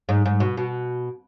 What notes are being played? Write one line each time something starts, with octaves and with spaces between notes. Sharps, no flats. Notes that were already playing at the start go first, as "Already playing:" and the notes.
G#2
G#2
B2
B2